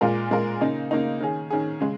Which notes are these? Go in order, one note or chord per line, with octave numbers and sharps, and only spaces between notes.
A#2 G#3 F4 A#4
A#2 G#3 F4 A#4
C#3 A#3 D#4
C#3 A#3 D#4
D#3 C#4 G#4
D#3 C#4 G#4
C#3 G#3